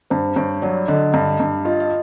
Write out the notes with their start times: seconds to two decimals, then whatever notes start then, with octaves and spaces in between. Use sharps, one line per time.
0.10 G2 C5
0.36 G2 C#5
0.62 F#3 D5
0.88 D3 D#5
1.14 G2
1.40 G2
1.65 F4 D#5
1.80 D#5